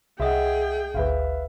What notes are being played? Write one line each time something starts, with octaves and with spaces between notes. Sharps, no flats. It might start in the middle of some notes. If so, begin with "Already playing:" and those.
C2 G#4 D#5 E5 F#5 G5
G#1 D2 B4 E5 F5